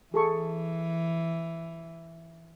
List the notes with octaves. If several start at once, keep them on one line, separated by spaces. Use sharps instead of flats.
E3 G#4 A4 C#6